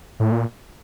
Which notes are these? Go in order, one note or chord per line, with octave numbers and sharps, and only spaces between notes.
A2
A#2